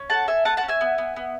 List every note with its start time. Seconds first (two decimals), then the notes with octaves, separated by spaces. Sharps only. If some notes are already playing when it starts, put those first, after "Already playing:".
Already playing: C#4
0.10 A4 F#5 A5
0.27 A4 E5 G#5
0.45 A3 F#5 A5
0.57 F#5 A5
0.63 C#4
0.68 E5 G#5
0.81 B3
0.98 B3
1.16 B3